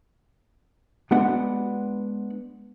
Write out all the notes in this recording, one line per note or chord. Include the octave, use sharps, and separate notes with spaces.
G#3 B3 D4 F#4 B4 F#5